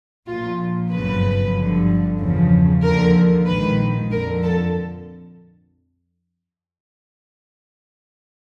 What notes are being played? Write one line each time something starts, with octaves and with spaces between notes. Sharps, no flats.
A#1 A#2 F3 F4
G1 F#2 C#3 F3 B4
G1 G2 D3 F3
E2 C#3 F3
D#2 D3 F3 A#4
A#1 G#2 D#3 B4
F2 D3 F3 A#4
A4